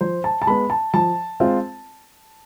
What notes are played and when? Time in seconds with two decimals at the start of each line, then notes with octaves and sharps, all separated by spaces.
0.01 F3 C5
0.24 A5
0.42 A5
0.47 G#3 B3 B5
0.70 A5
0.94 F3 A5
1.40 G#3 C4 F4